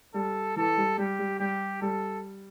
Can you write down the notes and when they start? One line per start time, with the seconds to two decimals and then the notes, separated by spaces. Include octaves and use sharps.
0.14 G3 A4
0.56 E3 A4
0.77 G3
0.98 G3 G4
1.19 G3
1.39 G3 G4
1.82 G3 A4